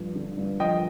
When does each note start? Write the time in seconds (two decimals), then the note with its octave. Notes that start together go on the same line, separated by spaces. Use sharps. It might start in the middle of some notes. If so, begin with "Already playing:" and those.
Already playing: G2 F3
0.15 D3
0.38 G2
0.60 F3 D#5 G5